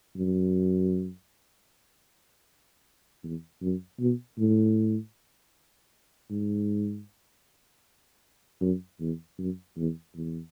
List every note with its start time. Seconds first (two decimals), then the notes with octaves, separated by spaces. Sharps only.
0.16 F#2
3.23 E2
3.62 F#2
4.00 B2
4.39 A2
6.31 G#2
8.61 F#2
9.00 E2
9.39 F#2
9.77 E2
10.16 E2